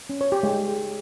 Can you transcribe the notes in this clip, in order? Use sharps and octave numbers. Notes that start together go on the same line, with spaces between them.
C#4
C#5
G4
G#3